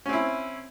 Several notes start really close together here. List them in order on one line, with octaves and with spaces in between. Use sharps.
C#4 C4 E4